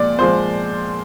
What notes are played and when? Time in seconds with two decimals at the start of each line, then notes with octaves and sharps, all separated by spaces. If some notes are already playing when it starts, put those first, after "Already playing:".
Already playing: A#2 F3 G#3 D5
0.18 A#2 F3 G#3 C5